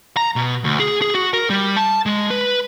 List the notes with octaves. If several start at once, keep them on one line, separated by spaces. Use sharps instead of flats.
A#5
B2
D2
G#4
G#4
F#4
A#4
G3
A5
G#3
B4